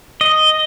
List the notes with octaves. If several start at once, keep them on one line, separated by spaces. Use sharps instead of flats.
D#5